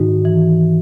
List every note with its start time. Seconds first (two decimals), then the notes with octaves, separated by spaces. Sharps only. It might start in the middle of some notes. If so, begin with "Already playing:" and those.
Already playing: G#2 D#3 D#4 F#4
0.25 E3